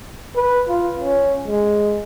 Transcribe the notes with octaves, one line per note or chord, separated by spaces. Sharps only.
B4
F4
C#4
G#3